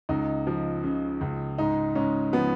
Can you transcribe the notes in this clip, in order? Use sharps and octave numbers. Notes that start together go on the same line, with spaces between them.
C#2 D#4
F3
C#3
C#2
G#2 D#4
G#2 C#4
F3 B3